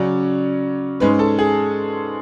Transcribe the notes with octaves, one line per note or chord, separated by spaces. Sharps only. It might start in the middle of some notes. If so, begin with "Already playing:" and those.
Already playing: C#3 F#3 C#4 D5
G#2 G#3 C#4 B4
A4
G#4